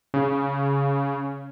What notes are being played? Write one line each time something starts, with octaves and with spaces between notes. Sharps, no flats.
C#3